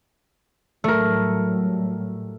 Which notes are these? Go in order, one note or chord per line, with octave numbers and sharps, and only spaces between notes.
A2 F#3 G3 A3 A#4